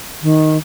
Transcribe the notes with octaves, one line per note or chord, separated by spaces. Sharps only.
D#3